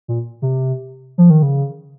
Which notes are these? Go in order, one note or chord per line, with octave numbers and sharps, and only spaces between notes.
A#2
C3
F3
D#3
C#3